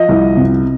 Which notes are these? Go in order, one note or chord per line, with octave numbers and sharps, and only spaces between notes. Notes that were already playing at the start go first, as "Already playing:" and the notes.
Already playing: F3 D#5
C2
C3